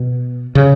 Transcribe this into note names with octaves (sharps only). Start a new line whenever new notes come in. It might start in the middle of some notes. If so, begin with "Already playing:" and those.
Already playing: B2
C#3